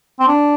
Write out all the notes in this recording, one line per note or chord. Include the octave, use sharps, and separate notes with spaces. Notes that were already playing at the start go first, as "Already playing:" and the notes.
C4
D4